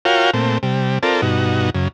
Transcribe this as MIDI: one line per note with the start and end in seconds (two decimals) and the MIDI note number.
0.05 0.31 65
0.05 0.31 66
0.05 0.31 70
0.05 0.31 73
0.05 0.31 77
0.05 0.31 79
0.34 0.58 46
0.34 0.58 57
0.34 0.58 60
0.63 0.99 48
0.63 0.99 55
1.03 1.21 60
1.03 1.21 65
1.03 1.21 69
1.03 1.21 70
1.03 1.21 74
1.22 1.70 43
1.22 1.70 47
1.22 1.70 63
1.22 1.70 66
1.74 1.88 42
1.74 1.88 49